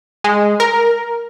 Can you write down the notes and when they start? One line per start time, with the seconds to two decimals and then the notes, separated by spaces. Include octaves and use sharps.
0.24 G#3
0.60 A#4